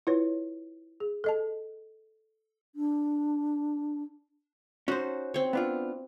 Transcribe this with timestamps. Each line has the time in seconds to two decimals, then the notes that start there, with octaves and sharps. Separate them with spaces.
0.07 E4 F4 B4 C#5
1.00 G#4
1.24 A4 D#5 A5
2.75 D4
4.88 C#4 D#4 F#4 C5
5.34 C4 C#5
5.53 B3 D4 F4